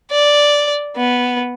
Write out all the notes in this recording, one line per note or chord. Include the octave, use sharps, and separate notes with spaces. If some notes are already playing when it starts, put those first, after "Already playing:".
D5
B3